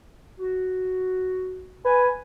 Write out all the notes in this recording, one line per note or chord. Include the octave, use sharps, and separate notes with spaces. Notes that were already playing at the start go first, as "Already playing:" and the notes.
F#4
B4 G#5